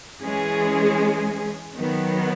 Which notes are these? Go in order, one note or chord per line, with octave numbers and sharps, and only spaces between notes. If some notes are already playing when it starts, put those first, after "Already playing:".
E3 G#3 C#4 G#4
D#3 F#3 B3